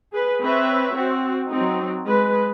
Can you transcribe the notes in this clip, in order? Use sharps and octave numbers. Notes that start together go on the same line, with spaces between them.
G#4 B4
C4 B4 C#5 E5
C4 F#4
F#3 C4 D#4
G#3 B4